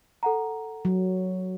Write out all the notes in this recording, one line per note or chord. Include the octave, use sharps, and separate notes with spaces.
A4 F#5 A#5
F#3